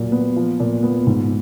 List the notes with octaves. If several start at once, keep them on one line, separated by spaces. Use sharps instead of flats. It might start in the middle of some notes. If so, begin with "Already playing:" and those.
Already playing: A#2 F#3
B3
F3
A#2
B3
G#2